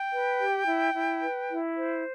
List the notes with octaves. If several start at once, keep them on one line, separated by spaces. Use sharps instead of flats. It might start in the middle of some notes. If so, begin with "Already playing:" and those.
Already playing: G5
B4
G4
E4
E4
B4
E4
C5